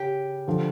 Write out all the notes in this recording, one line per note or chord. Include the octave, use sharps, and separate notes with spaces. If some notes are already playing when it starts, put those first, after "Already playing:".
Already playing: C#3 G4
D3 F3